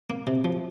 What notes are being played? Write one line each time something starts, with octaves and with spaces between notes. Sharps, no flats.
A#3
C3
F3